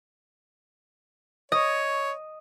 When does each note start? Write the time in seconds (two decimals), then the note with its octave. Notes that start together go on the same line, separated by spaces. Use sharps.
1.52 C#5 D#5